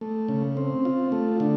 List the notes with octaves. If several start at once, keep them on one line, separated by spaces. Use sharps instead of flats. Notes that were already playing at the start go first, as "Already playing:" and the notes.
A3
C#3
C4
F4
A3
D3